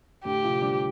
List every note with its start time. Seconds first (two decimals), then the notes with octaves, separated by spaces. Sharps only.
0.25 A2 D3 G4
0.44 C3 F3
0.62 D3 G3